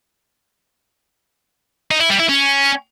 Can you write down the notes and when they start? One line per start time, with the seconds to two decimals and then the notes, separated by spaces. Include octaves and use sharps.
1.91 D#4
2.01 E4
2.10 G3
2.19 E4
2.29 C#4